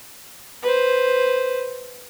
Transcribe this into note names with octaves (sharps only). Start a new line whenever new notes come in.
B4 C5